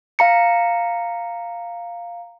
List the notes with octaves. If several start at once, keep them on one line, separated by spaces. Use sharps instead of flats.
F5 A#5 C#7